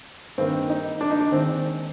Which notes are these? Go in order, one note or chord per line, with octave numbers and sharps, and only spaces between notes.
G2 D#3 A#3 C4
D#4
D4
D#4
D4
D#2 D#3 G#3 C4